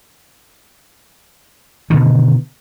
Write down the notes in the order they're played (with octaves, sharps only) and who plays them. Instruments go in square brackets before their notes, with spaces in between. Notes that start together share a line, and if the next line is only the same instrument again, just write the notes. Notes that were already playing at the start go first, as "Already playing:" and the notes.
[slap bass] B2 D3 D#3